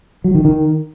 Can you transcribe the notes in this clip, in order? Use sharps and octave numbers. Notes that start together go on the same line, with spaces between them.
F#3
D#3
D#3